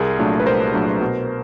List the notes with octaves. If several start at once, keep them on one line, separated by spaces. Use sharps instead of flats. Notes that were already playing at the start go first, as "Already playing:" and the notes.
Already playing: C2 G#4 A#4
A#2 F#3 A3 D4
B4
C2 A#4 C5
A#2 F#3 A3 D4
B2